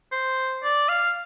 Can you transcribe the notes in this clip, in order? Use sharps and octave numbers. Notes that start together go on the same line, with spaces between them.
C5
D5
F5